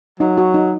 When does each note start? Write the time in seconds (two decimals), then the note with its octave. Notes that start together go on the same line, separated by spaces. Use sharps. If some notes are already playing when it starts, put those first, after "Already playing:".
0.20 F#3 D#4
0.38 F#4
0.54 D#4